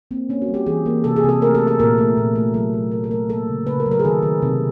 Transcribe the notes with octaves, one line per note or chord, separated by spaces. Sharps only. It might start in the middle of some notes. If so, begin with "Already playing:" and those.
A#3 C4
A#3 C#4
F#4
G3
G4
E3 G#4
A#3
C3 A4
G#4
C3
A4
A3 A#4
A4
A3
A4
A#2 A#4
A3
A#2
A3
F#3 A4
F#3
A3 A#4
A4
A3 A#4
A#3 A4
C#3
C#3 B4
A#4
F#3
A#4
G#4
D#3 A4
D#3
C3